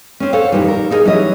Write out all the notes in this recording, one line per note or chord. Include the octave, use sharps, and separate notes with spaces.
C4 C#4
A4 C5 C#5 F5 F#5
F2 A#2 D#3 E3 G3
A#4
D#4 E4 G#4 A#4 D#5
E3 F#3 G3 C#4 E4 D#5